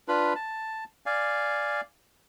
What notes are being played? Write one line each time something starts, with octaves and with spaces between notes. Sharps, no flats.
D4 F4 B4 B5
A5
D5 F5 G#5